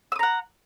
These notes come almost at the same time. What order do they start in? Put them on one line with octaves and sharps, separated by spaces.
E6 D#6 A#5 F#5